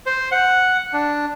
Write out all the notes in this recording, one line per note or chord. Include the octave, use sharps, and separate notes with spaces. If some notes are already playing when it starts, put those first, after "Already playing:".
C5
F#5
D4